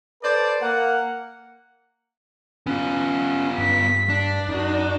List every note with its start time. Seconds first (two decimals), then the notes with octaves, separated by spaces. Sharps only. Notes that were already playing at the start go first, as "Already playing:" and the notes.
0.23 A4 B4 C5 D5
0.61 A#3 F#5
2.67 B3 C#4 F4
3.58 G2 B6
4.09 D4
4.49 F#2 D#4 F#4